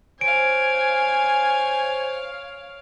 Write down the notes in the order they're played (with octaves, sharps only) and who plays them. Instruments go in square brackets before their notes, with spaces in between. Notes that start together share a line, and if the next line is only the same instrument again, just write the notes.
[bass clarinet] C5 [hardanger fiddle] C#5 F5 [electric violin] G#5 [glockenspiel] D7